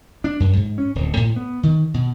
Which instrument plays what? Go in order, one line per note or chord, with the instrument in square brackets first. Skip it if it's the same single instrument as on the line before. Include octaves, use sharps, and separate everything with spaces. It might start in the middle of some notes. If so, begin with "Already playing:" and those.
[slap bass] D4
F#2
G#2
C#4
D1
A2
B3
D#3
B2